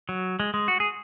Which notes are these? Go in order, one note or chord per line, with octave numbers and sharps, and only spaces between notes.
F#3
G#3
G#3
F#4
G#4